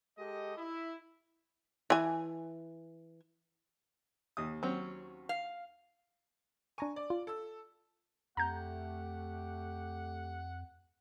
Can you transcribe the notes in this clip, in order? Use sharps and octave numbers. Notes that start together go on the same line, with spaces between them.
G#3 G4 A4 D#5
E4
E3 G#5
D#2 D#6
F#3 C4 C#4
F5
D4 G#5 A#5 C#6 D#7
D5
F4
A4 E6
F2 A3 G4 F#5 A#5 G6